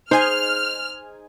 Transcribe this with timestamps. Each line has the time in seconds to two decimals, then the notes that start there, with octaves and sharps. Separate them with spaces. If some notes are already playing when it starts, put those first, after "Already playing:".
0.11 D#4 G#4 C5 G#5 F6